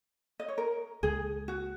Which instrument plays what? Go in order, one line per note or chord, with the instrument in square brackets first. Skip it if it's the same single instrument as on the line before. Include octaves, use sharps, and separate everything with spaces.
[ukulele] D#5
C#5
A#4
[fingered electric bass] C#2 C#3 G#3 [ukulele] G#4
[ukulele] F#4